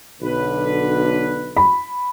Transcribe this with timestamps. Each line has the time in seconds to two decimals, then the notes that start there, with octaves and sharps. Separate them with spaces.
0.21 B1 D3 B4
1.57 B5